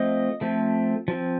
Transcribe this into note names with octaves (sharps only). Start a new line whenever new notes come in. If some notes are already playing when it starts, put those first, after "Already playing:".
Already playing: F3 A3 C4 D#5
F3 A3 C4
F3 C4